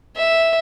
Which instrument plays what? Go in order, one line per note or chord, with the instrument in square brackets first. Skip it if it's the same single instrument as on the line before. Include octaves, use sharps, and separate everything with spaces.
[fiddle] E5